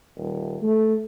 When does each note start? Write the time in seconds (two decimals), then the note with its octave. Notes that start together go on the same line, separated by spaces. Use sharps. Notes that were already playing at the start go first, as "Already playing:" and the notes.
0.17 D#1
0.63 A3